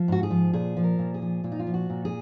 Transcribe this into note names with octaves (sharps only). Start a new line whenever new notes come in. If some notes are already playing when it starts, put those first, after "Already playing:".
Already playing: F3
G#2 F#4
G#4
F3
A#2 G#4
F3
A#4
A#2
G#4
F3
A#2 F4
D#4
F4
F3
F#4
A#2
G#4